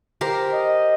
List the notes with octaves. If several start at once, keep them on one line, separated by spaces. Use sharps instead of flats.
G4 A#4 C5
D#5